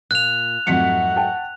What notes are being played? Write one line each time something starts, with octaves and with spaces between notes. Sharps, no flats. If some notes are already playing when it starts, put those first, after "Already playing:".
A#2 F#6 F7
F2 G#2 F#3 A3 F#4 B6 C#7
G5 A5